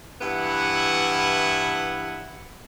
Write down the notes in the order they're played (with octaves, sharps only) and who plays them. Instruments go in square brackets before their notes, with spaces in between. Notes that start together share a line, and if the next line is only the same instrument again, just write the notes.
[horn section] G2 E3 B3 E4 F#5